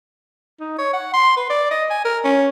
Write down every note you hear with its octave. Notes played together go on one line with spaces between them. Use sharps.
D#4
C#5
F#5
C6
B4
D5
D#5
G#5
A#4
C#4